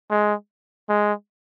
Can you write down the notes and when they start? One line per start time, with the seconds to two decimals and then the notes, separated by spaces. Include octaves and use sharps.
0.10 G#3
0.89 G#3